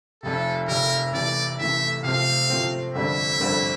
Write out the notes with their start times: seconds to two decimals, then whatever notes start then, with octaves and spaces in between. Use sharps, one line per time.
0.23 F1 F2 C3 A4
0.68 F1 F2 C3 A#4
1.13 C3 E3 A3 D5
1.59 C3 E3 A3 E5
2.04 C3 F3 A3 C4 F5
2.50 C3 F3 A3 C4
2.95 G1 F2 D3 G3 C4 E5
3.40 G1 F2 D3 G3 C4